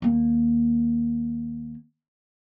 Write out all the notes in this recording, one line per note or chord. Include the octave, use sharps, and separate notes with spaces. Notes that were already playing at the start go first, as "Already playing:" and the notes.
D#2 A#3